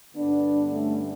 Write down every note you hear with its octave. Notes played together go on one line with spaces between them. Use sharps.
G2 D3 B3 D4
A3 C#4